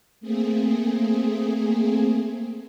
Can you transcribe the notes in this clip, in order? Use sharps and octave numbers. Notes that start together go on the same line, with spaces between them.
A3 A#3 C4 G#4